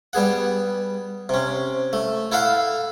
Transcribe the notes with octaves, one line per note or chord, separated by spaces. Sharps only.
G3 B3 G#4 F#5
C3 C#4
A3
E4 A4 F5 F#5